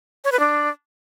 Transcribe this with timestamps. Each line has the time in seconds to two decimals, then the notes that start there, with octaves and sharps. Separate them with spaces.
0.24 C#5
0.32 B4
0.40 D4